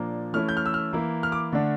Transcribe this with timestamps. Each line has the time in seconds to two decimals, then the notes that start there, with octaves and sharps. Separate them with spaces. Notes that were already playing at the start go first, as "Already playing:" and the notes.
Already playing: A#2 F3 A#3 D4
0.33 E3 A3 C#4 E4 F6
0.49 G6
0.57 F6
0.66 E6
0.74 F6
0.93 E3 A#3 E4
1.23 F6
1.32 D6
1.52 D3 A3 D4